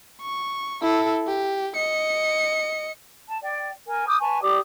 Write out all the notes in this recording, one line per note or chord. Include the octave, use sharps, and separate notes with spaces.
C#6
E4 A4
G4
D#5 C#7
A5
D5 G5
A#4 G#5
D6 D#6 F6 G6
B4 G#5 A5 C#6
G4 D5 D6 D#6